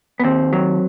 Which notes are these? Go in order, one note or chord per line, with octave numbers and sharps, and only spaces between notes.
B3
D#2 C4
F#3